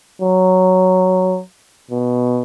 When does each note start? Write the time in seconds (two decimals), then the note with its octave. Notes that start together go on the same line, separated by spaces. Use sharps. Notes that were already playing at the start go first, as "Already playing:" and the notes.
0.21 F#3
1.91 B2